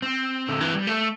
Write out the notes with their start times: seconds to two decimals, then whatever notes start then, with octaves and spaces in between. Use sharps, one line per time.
0.02 C4
0.48 D3
0.61 E3
0.74 G3
0.87 A3